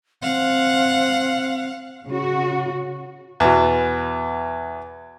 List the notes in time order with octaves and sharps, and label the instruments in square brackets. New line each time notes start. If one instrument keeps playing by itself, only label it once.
[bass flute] C4 [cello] F5 F#5
[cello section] C#3 F#4
[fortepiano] E2 B2